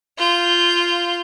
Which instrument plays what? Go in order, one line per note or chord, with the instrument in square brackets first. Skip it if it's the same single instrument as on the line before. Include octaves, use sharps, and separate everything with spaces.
[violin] F4 G6